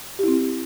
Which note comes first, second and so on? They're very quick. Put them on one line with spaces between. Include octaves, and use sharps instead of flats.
G4 E4 C4